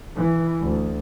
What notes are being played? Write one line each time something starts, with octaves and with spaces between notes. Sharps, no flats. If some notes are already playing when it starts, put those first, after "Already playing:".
E3
D2